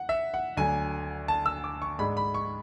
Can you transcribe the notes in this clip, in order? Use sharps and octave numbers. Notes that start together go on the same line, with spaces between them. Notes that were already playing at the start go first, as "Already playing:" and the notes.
Already playing: F#5
E5
F#5
D2 D3 F#3 G#5
A5
E6
D6
C#6
G#2 G#3 D4 B5
B5
C#6